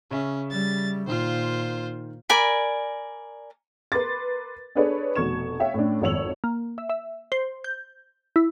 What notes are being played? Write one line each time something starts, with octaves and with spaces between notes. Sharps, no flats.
C#3 C#4 E5
G3 A6
A#2 D#3 F4 C5
A#4 D5 G#5 B5
A#4 B4 B5 C6 D6 A6
D4 G#4 A4 B4 C#5 D5
F1 B2 C#6 G#6 E7
C#5 E5 F5 G5
A2 C#4 D4
G#1 F2 C#5 E6 F7 F#7
A#3
E5
E5
C5
G6
E4